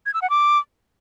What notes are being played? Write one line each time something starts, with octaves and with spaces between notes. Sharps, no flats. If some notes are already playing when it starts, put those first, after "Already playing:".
G#6
E6
F#5
D6